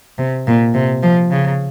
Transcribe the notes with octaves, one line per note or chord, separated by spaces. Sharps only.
C3
A#2
C3
F3
C#3